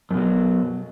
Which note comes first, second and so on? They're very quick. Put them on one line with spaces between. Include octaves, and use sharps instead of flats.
F#2 B2 F#3